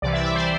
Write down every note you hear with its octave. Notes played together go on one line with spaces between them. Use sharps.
C2 C3 E3 D5
E5
D5
C5